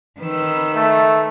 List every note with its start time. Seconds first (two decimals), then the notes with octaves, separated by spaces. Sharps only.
0.19 D#3 B4 E6
0.76 A3